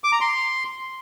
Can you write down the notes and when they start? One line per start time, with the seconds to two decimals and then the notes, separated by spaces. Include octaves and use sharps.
0.04 D6
0.12 A#5
0.21 C6